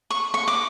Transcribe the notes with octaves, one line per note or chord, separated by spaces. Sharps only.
C#6
C#6
D6